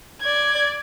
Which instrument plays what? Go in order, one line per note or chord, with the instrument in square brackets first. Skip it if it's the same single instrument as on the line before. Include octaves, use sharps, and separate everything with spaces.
[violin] D5 G#6